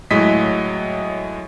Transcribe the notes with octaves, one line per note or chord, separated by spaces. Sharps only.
A2 F#3 G#3 D#5 B6